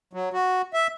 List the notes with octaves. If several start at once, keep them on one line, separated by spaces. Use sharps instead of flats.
F#3
F#4
E5